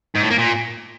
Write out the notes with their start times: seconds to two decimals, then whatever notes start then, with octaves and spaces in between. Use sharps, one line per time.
0.15 G#2
0.23 A2
0.31 A#3
0.38 A#2